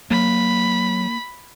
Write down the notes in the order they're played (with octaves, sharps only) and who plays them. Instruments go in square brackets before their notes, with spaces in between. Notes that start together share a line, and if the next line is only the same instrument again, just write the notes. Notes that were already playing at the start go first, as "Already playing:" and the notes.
[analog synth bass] F#3 [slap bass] A#3 [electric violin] B5